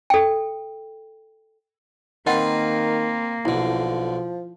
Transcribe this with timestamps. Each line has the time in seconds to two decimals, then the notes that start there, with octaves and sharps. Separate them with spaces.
0.10 A4 G5
2.27 D#3 A#3 C4 F4 B4 D#5 F#5
3.45 B1 D3 F3 E4